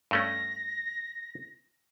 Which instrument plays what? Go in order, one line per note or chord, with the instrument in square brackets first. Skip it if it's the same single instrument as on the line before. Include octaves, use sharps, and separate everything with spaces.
[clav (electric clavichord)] G2 A3 C#4 [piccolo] A#6